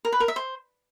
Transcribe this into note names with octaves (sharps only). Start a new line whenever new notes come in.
A#4
B4
A#4
E5
C5